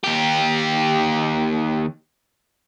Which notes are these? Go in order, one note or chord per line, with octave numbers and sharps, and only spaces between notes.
D#2 G4